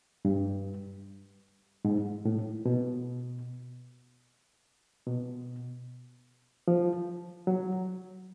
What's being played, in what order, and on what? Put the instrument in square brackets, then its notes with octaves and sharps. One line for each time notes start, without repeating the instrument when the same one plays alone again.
[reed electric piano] G2
G#2
A2
B2
B2
F3
F#3